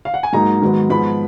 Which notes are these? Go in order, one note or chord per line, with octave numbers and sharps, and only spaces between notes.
F5
F#5
G#5
G#2 F#3 A#3 D#4 A#5
G#2 D#3 F#3 B3
G#2 F3 B3 B5